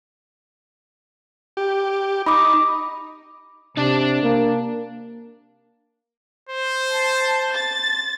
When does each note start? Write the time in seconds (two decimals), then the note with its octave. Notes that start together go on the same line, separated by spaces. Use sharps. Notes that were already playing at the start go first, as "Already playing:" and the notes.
1.57 G4
2.26 D#4 B5 D6
3.77 C3 D4 D5
4.23 A#3
6.49 C5
6.92 A5
7.53 A6